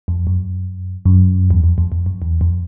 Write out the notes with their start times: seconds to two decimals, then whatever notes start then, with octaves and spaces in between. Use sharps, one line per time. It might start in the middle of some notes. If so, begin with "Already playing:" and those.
0.08 F2
0.27 F#2
1.05 F#2
1.51 E2
1.64 F2
1.78 F2
1.92 F2
2.06 F#2
2.22 E2
2.41 F2